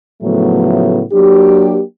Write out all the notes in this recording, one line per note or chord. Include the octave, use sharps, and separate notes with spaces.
A2 C#3 F3 F#3 A3 B3
F#3 A#3 D4 G4